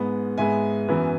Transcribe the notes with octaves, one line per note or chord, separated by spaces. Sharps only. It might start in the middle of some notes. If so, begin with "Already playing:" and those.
Already playing: G#2 G#3 B3
G#2 G#3 B3 E5 G#5
F#2 E3 B3